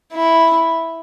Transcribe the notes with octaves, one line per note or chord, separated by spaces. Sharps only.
E4